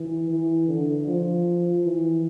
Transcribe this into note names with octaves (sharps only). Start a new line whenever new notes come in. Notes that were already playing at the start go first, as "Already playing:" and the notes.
Already playing: E3
E3
D3
F3
E3